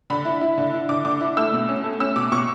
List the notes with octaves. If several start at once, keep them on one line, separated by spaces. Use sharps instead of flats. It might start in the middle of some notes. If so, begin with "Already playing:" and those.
D3 B5
E4
E4
D3
E4
D3 D6
D3 D6
E4
A3 E6
B2
C#4
A3
C#4 E6
B2 D6
B2 C#6